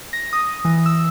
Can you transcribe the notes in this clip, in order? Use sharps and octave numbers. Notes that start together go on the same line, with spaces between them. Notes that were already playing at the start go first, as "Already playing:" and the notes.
A#6
D#6
E3
E6